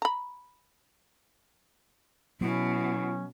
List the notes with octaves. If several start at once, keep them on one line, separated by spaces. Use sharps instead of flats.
A#5 B5
B2 F#3 B3 C#4 E4